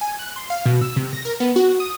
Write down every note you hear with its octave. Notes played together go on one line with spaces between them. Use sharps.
G#5
F#6
C6
F5
B2
E6
C3
A#6
A#4
B3
F#4
D#6